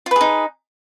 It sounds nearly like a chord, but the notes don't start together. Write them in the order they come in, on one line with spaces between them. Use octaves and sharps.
F4 B4 G#4 D#4